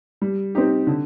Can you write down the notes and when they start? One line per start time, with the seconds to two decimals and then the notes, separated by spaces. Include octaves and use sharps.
0.22 G3
0.55 C4 D#4 G4
0.87 D3